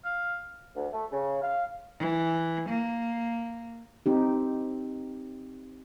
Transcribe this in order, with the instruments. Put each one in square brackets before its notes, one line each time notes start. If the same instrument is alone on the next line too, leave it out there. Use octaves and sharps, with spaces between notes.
[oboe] F5
[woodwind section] D2
A3
C#3
F5
[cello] E3
A#3
[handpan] C4 D#4 G4